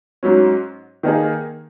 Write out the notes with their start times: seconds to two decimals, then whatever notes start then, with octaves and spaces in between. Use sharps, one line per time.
0.23 G#2 F#3 C#4
1.03 D#3 A#3 D#4 G#4